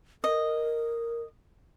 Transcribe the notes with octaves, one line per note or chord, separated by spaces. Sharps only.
A#4 D#5